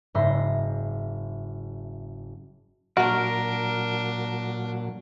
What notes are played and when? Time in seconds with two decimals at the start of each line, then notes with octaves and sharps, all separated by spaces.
0.15 F#1 G#2 E5 C6 A#6
2.97 A#2 F#3 D4 F#4 A#4